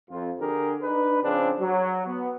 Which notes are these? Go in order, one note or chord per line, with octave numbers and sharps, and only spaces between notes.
F2 F4
D3 G4 G#4 A#4
D4 D#4 B4
C#3 F3 C4 D4
F#3
B3